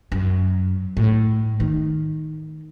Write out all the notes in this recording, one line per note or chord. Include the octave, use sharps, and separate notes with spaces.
F#2
A2
D#3